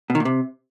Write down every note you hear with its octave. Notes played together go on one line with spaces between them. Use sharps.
B2
D#3
A#2
C3